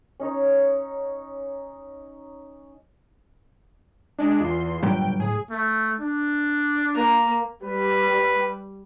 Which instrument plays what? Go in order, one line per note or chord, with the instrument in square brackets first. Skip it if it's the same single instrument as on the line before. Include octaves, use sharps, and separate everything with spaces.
[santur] C#4 D#4 C#5
[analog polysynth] G#3 D4
[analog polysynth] E2 C6 [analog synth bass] F4
[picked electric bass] G1 F#3 G3 [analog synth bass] A#2 [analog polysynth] G5
[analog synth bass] A2 [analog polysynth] G#4
[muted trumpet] A3
D4
[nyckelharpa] A#3 A#5
[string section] G3 [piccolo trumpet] B4